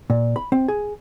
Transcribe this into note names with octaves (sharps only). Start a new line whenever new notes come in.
A#2
B5
C4
G#4